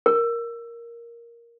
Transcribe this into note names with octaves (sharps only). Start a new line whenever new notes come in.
A#4